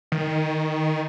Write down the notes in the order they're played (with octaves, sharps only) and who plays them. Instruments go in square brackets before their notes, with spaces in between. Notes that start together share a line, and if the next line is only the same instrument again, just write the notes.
[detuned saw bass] D#3